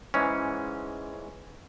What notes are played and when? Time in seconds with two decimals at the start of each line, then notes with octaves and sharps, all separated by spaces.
0.14 G#2 E3 G#3 C#4